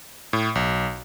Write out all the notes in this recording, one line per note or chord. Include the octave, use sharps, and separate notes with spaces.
A2
B1